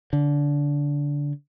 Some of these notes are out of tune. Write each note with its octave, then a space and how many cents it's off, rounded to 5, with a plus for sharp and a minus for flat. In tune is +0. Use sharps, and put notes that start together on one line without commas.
D3 -20